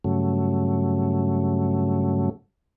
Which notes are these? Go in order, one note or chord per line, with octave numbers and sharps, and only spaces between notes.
G2 C#3 F#3 A3